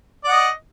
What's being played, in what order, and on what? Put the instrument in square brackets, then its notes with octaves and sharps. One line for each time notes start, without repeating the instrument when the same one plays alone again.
[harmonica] D5
F#5
D#5